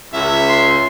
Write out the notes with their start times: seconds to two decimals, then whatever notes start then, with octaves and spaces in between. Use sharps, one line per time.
0.14 C#2 C#5 E5
0.49 C6